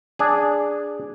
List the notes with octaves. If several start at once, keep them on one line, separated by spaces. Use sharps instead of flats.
D4 G#4